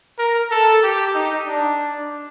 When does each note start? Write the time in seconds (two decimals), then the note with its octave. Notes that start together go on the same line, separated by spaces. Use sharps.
0.19 A#4
0.51 A4
0.83 G4
1.15 D#4
1.47 D4